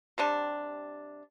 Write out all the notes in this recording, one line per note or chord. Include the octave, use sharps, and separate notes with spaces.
C3 G3 D4